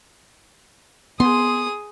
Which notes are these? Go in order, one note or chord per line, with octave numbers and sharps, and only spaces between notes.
B3 G#4 C6 D#6